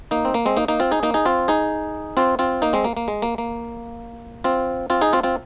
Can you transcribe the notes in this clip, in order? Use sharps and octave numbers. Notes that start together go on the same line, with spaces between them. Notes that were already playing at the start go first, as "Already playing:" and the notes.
A#3 D#4
C4
A#3
G#3 C4
A#3 D#4
A#3 D#4
C4 F4
D#4 G#4
A#3 D#4
D#4 G#4
C4 F4
D#4 G#4
C4 F4
C4 F4
A#3 D#4
G#3 C4
A#3
A#3
G#3
A#3
A#3
C4 F4
C4 F4
D#4 G#4
C4 F4
C4 F4